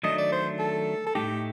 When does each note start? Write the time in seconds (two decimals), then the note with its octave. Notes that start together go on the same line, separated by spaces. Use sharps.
0.03 D#3 F#3 A3 D4 D#5
0.18 D5
0.32 C5
0.59 A4
1.06 A4
1.15 A2 A3 D#4 G4